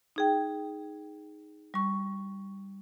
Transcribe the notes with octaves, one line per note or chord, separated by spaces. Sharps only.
D#4 G#4 G5
G3 C#6